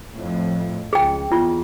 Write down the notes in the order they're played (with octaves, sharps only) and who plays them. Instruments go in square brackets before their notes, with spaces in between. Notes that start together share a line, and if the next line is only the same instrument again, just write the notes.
[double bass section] F2 A2
[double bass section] C#2 [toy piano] G#4 G5
[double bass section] E2 [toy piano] F4